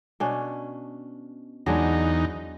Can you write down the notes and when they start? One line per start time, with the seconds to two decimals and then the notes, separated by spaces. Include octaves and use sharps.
0.20 B2 C#4 D4
1.66 E2 F#3 G#3 D4 D#4